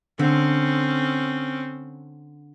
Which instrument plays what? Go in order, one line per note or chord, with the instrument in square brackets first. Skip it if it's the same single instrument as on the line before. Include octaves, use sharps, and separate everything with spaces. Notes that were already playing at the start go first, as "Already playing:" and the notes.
[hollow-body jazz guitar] D3 [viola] C4 C#4